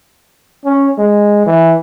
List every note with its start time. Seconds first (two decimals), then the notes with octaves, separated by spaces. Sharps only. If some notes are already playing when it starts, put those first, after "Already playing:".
0.65 C#4
0.98 G#3
1.47 E3